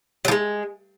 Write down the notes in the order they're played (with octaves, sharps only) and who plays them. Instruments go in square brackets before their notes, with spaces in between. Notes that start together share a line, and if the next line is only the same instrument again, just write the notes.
[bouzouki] F#3
F3
G#3